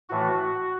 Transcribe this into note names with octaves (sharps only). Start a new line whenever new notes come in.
A2 E3 A3 F#4